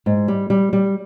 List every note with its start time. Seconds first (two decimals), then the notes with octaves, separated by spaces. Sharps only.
0.06 G#2
0.28 G3
0.50 G3
0.73 G3